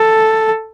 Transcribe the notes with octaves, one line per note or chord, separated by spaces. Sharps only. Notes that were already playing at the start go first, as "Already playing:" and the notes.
Already playing: A4